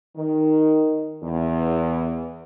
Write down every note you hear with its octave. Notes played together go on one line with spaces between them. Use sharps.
D#3
E2